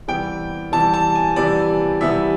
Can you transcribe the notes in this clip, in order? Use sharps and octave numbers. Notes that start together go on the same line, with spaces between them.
C3 E3 G3 B3 G5
C3 E3 G3 B3 A5
A5
G#5
C3 E3 G3 B3 D5
C3 E3 G3 B3 E5